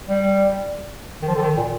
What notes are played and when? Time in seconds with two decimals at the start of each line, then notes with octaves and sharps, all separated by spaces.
0.09 G3
1.22 D#3
1.28 F3
1.35 D3
1.42 D#3
1.57 A#2